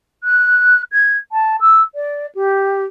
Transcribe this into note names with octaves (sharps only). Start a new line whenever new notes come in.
F#6
G#6
A5
E6
D5
G4